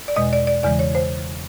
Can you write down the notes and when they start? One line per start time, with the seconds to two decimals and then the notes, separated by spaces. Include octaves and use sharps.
0.08 D5
0.16 E2 B2 G#3 D#5
0.33 D5
0.47 D5
0.63 E2 C#3 E3 G#3 D5
0.79 C#5
0.95 C5